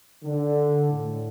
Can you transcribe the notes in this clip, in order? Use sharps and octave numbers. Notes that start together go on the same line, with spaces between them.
D3
A2